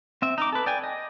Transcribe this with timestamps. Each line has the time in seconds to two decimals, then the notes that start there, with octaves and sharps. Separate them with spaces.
0.22 C4 E5
0.38 D#4 D6
0.52 A4 B4
0.66 D5 G5 G#5
0.84 D#5